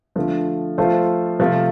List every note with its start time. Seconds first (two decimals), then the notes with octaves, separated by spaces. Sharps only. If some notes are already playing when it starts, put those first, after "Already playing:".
0.16 D3 F3 A3
0.78 F3 A3 F4 A4 C5
1.39 C3 F3 A3 F4